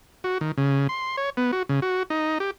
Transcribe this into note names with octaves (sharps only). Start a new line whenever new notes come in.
F#4
D#3
C#3
C6
C#5
B3
F#4
C#3
F#4
D#4
G4